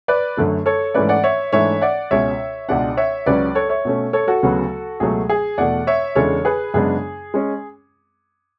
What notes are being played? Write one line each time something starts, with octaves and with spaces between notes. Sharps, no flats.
B4 D5
F#2 D3 A3
A4 C#5
G#2 E3 A3 C#4 B4 D5
D5 F#5
C#5 E5
G#2 E3 A3 D4 C#5 E5
D5 F#5
C#2 B2 G#3 C#4 C#5 E5
C#2 B2 G#3 D4 D5 F#5
C#5 E5
C#2 C#3 F#3 C#4 B4 D5
A4 C#5
C#5 E5
B2 A3 C#4
A4 C#5
F#4 A4
D2 C#3 F#3 B3
C#2 B2 F#3 A3 G#4
G#4
E2 B2 A3 D5 F#5
C#5 E5
E2 C#3 G#3 D4 A4 C#5
G#4 B4
F#2 C#3 G#3 B3 D4 G#4
G#3 C#4